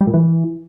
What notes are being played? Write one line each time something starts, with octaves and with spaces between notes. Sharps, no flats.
G3
A#2
E3